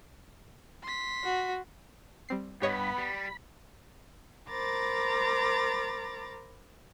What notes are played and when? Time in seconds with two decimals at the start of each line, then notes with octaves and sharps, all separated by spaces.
0.83 C6 B6
1.24 F#4
2.29 G3 C4 C7
2.62 G2 B3 G4 C#5 D#5 B5
2.98 G3
4.50 A#4 C5 A#5 B5 D6 A6